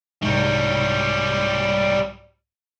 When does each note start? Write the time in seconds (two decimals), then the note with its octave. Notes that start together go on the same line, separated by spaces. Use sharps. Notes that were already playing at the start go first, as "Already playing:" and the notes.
0.22 C2 G#2 F#3 G3